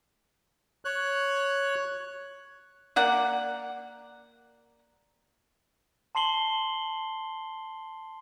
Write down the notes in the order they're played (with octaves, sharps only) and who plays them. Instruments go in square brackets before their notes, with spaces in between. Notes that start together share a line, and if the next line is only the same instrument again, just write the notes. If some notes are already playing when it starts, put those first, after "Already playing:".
[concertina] C#5 F#6
[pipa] A#3 D5 F#5
[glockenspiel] A5 C6 C7 F#7 G7